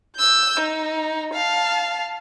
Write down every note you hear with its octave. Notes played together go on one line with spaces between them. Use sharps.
E6 G6
D#4
F5 A5